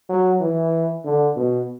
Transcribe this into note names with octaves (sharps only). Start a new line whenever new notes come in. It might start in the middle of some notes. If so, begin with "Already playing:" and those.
F#3
E3
D3
B2